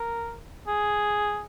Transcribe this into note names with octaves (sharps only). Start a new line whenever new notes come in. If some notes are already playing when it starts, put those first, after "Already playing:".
Already playing: A#4
G#4